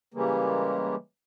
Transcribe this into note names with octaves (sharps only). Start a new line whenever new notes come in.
C#3 E3 G3 G#3 A#3